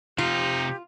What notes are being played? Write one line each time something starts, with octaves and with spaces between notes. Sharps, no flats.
C3 F3 D#4 F4 G4